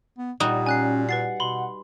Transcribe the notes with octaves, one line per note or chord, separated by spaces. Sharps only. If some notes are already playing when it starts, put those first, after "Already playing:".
B3
A#2 G3 D#4 F#4
C#4 G#5 F#6 C7
B4 F#5 A6 C7
B2 B5 C6